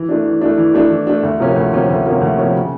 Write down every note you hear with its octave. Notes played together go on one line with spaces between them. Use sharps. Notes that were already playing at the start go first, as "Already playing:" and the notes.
Already playing: E3
A3 D4
E3
A3 D4
E3
A3 D4
E3
A3 D4
D2
C3 F3 A#3 C#4
D2
C3 F3 A#3 C#4
D2
C3 F3 A#3 C#4
D2
C3 F3 A#3 C#4
C#3